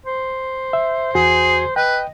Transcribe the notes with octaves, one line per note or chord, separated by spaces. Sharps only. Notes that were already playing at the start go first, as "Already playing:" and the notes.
C5
E5
E2 F#4 G#4 G#5
B4 D#5 G5